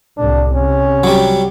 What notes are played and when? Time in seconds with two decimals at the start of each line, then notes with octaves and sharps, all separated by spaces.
0.18 C2 A2 D4
0.55 C3 C#4
1.04 F#3 G3